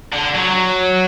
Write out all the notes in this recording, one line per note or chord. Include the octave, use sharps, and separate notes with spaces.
D3
F#3